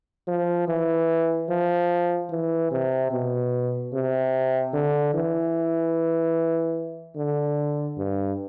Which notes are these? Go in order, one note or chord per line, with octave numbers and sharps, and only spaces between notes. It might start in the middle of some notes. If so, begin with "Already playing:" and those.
F3
E3
F3
E3
C3
B2
C3
D3
E3
D3
G2